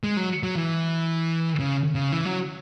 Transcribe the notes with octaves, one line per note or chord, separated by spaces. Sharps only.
G#3
F#3
F#3
E3
C#3
C#3
E3
F#3